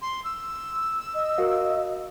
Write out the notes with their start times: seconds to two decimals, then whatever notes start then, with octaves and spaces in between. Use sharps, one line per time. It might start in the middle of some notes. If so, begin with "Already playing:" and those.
0.02 C6
0.25 E6
1.14 D#5
1.38 F#4 A#4 F5